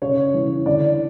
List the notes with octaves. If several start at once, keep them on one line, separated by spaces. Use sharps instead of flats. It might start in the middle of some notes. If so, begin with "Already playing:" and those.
C#3 C#5
E3
D3 D5